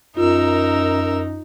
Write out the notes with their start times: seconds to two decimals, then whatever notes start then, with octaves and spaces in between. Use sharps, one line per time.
0.17 F#2 D#4 F4 A#4 E6